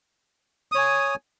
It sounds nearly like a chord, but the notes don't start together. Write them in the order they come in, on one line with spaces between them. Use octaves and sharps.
D#6 C#5 G#5